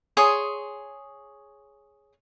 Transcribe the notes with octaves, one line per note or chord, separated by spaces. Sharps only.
G#4 C#5 C6 D#6